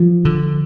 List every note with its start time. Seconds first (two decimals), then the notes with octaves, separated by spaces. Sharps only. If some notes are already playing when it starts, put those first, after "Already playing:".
Already playing: F3
0.25 D3